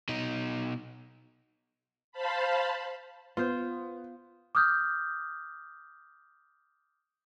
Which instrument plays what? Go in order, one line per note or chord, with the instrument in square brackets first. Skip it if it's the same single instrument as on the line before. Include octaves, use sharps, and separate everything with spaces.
[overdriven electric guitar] B2 D#4
[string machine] C5 F5 A5 B5
[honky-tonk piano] B3 [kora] F4 C5
[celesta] D6 D#6 F6 G6